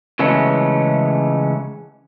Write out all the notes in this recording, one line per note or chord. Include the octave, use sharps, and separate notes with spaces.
C#3 E3 G#3 A3 C#4